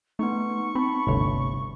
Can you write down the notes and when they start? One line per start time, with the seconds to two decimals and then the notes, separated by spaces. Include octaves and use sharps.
0.19 A3 B3 D#4 C#6
0.75 C4 A5 B5
1.07 G1 D2 C3 C#5